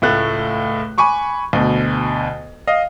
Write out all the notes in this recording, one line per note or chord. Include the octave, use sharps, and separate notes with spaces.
C#2 A2 A3 F#6
G#5 B5 C#6 D6
D2 B2
D#5 F5